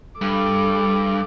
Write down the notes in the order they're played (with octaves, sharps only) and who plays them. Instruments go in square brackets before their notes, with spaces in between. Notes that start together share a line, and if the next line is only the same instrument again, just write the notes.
[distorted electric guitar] G2 [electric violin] A4 D6